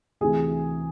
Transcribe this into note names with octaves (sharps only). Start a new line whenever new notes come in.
D2 C3 E3 G#4